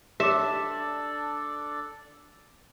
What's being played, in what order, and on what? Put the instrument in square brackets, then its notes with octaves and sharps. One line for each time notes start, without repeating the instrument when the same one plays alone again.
[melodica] D4 A4 D5 [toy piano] G4 D6 [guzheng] E5